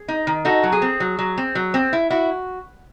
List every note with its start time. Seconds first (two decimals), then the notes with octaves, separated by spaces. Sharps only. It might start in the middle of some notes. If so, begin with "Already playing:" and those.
Already playing: G#4
0.08 D#4
0.27 D#3
0.45 D#4 F#4 A4
0.63 F#3
0.72 G#4
0.82 C4
1.00 F#3
1.19 F#3
1.37 C4
1.55 F#3
1.74 C4
1.93 E4
2.10 E4 F#4